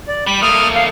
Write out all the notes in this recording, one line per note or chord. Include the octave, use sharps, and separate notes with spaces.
D5
G3 B5
A3 A#3 D#6 F6
F5